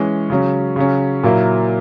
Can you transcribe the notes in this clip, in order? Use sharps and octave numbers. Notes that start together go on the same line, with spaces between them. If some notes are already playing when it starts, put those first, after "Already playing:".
Already playing: E3 G#3 C#4
C#3 F#3 C#4
C#3 F#3 C#4
A#2 F#3 A#3 E4